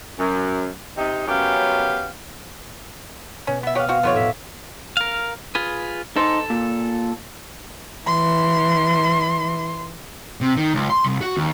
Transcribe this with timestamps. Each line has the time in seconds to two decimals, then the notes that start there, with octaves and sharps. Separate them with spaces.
0.18 F#2
0.97 C3 D#4
1.27 F#2 B3 C#4 G4 F5
3.47 B2 C#4
3.63 B3 E5
3.75 G4 C#5 D#5 F5 F#5
3.89 C4 F#4
4.03 F1 B3 F4 C#5 D6
4.15 A2 E5 B6
4.97 A#4 F5
5.55 F4 G#4 B4
6.16 D#4 A4 C5
6.50 A#2
8.07 E3 C6
10.41 C3
10.56 D#3
10.74 C#2
10.90 C6
11.05 C2
11.21 F#4
11.37 D#2